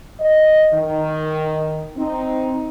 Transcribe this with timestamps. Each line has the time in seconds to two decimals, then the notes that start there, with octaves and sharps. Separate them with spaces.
0.20 D#5
0.73 D#3
1.97 C4 D#4